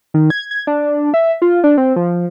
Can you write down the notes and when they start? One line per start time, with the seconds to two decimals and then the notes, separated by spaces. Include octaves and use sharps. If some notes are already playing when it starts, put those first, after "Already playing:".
0.14 D#3
0.30 G#6
0.51 G#6
0.67 D4
1.14 E5
1.42 F4
1.64 D4
1.77 C4
1.96 F3